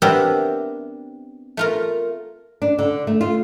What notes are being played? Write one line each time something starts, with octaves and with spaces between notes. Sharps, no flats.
B3 C4 D4 G4 A#4 E5
A3 F4 A#4
D4
D3
A3
F4